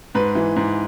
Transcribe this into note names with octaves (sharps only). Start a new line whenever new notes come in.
G#2 B4
E3
G#2